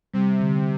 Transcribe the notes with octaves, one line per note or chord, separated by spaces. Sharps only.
C3 G3
D3